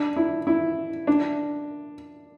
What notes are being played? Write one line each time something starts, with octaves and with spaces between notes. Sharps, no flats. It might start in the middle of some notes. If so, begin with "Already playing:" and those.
Already playing: D4
E4
E4
D4